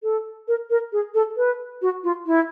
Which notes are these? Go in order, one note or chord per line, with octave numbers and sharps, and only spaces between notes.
A4
A#4
A#4
G#4
A4
B4
F#4
F4
E4